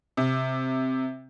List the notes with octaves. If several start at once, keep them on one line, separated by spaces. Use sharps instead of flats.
C3